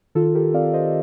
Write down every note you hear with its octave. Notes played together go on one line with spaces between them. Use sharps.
D#3 F4 A4
G4 A#4
C4 D5 F5
C5 D#5